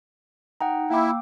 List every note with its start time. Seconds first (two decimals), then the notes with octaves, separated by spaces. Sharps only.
0.61 D#4 F#5 G5 A#5
0.90 A#3 E4 F5 G5 D6 E6